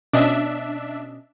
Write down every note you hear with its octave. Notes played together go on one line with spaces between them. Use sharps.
B2 C#4 D4 D#5 E5